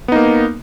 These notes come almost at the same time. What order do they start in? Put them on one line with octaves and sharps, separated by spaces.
B3 D#4 A#3